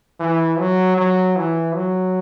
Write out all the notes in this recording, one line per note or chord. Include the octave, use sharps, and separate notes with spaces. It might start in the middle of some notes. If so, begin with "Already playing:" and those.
E3
F#3
F#3
E3
F#3